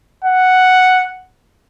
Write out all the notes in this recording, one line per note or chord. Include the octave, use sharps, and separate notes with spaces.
F#5